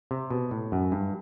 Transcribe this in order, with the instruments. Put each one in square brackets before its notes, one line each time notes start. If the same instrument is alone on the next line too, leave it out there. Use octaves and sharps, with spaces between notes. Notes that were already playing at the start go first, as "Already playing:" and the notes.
[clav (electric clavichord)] C3
B2
A2
F#2
G2